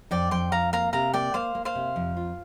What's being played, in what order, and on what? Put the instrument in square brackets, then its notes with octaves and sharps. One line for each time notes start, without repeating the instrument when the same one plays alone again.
[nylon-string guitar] F2 [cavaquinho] D5 G5
[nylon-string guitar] F2 [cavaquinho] G5 C6
[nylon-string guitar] F2 [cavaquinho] F5 A#5
[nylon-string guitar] A#3 [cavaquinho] F5 A#5
[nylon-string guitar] C3 [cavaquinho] F5 A#5
[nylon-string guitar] A#3 [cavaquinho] D5 G5
[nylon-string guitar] A#3 [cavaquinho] C5 F5
[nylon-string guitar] A#3
[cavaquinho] C5 F5
[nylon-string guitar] C3
F2
F4